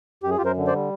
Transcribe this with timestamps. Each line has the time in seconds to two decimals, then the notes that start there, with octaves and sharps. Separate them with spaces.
0.23 F#2 G4
0.30 G#4
0.37 F#2 F4 G4
0.45 A#4 C5
0.57 D3
0.67 C5 D5
0.73 G3